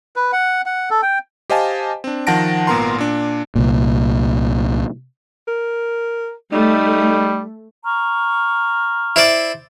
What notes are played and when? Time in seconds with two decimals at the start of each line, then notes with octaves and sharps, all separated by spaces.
0.16 B4
0.33 F#5
0.66 F#5
0.90 A4
1.03 G5
1.50 G4 C5 D#5 F5 G#5 A5
2.04 C4 D4
2.27 D#3 F3 F#5 A5 A#6 D7
2.67 G#1 A#2 B3 A#4 A#5 C6
2.98 A#2 D4
3.55 C2 A#2
5.48 A#4
6.52 G3 A3 D#4
7.85 A#5 C#6 F6
9.16 E4 C5 D5